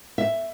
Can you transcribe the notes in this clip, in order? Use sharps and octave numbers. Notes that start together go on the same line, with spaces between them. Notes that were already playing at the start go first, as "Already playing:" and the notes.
E5